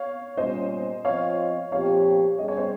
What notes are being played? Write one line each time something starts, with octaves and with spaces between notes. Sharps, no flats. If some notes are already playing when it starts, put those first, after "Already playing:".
Already playing: C#5 F5
A#2 G3 C#4 C5 D#5
F3 C4 F4 C5 C#5 D#5 F5
A#2 F3 C4 G4 C#5 F5
G3 C#4 G#4 D#5
C#5
C5 D#5